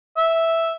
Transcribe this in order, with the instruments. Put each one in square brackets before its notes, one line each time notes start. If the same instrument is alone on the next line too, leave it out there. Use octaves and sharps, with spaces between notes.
[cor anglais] E5